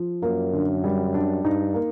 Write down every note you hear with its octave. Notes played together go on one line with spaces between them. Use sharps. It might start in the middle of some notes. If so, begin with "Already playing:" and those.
Already playing: F3
F#2 A#3
D3
G3
D4
G2 D#4
A#3